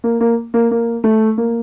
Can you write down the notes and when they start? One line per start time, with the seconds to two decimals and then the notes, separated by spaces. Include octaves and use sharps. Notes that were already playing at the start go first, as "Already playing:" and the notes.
0.04 A#3
0.21 A#3
0.54 A#3
0.71 A#3
1.04 A3
1.38 A#3